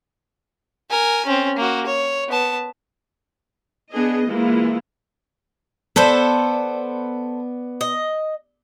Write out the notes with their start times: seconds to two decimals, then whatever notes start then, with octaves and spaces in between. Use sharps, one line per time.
0.90 A#4 G#5
1.25 C4 C#4
1.57 A#3 F#4
1.86 C#5
2.28 B3 A5
3.92 B3 D4 G#4 D#5
4.27 E3 G#3 A#3 E4 F4
5.96 B3 A4 B4 C5 D5
7.81 D#5